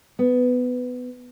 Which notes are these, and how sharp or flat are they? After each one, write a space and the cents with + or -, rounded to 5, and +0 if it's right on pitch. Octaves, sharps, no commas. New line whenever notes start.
B3 +15